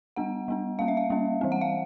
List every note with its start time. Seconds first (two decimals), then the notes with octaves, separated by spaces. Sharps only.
0.16 G3 B3 D4 F#5
0.48 G3 B3 D4
0.79 G3 A#3 C#4 F5
0.88 E5
0.97 F5
1.10 G3 A#3 C#4
1.41 E3 G3 C4
1.52 F#5
1.61 F5